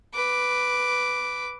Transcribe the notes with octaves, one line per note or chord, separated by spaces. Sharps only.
B4 D6